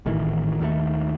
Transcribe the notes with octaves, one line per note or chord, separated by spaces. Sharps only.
G#1 A2 D#3 E3
D#2 D#3 G#3 A3